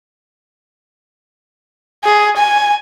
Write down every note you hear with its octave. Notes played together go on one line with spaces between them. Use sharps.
G#4
G#5